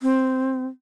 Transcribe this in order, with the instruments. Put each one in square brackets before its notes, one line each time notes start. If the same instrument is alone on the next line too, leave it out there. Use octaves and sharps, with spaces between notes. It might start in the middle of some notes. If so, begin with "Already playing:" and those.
[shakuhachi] C4